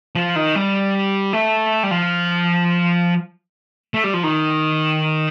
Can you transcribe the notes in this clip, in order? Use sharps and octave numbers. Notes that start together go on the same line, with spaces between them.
F3
D#3
G3
A3
G3
F3
A3
G3
F3
D#3